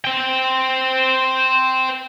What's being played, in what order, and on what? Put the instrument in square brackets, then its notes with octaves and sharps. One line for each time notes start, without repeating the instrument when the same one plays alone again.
[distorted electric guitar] C5 G5